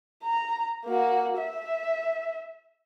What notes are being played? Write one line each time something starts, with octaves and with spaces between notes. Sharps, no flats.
A#5
A#3 F#4
E5